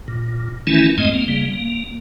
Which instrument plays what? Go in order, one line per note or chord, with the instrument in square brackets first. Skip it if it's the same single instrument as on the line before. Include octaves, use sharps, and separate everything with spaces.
[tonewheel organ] A#2
D#3 E3 A3 C#4 E4
F2 G#2 G#3 A3 C4 D#5
A#3 C4
C#3 G3 A#3
A#3